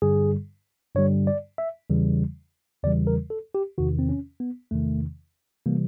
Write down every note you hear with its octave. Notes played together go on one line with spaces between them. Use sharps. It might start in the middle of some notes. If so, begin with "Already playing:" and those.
G2 D3 G3 G#4
G2 D3 G3 C#5
D5
E5
E2 C#3 E3 G3
E2 C#3 E3 G3 D5
A#4
A4
G4
E2 C3 D#3 F#4
C4
C#4
B3
E2 C3 D#3 A3
C3 E3 G3 A#3